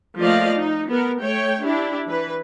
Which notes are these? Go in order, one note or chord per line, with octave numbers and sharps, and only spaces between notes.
F3 A3 A#3 D5 D#5 F5
D#4
B3 A#4
A3 C#5 G5
D4 E4 G4
E3 B4